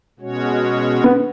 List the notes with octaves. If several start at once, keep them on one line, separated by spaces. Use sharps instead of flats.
B2 G#3 C#4 F#4 C#5
B3